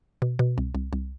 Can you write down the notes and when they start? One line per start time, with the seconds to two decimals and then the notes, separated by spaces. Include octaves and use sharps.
0.22 B2
0.39 B2
0.58 C2
0.75 C2
0.93 C2